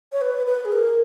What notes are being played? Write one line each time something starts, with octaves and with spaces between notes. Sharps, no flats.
C#5
B4
B4
G#4
A#4